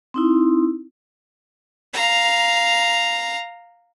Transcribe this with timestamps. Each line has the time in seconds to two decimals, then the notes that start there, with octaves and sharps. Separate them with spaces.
0.14 C4 D#4 E4
1.94 F5 A#5